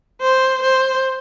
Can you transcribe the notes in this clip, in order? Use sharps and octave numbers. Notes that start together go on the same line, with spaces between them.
C5
C5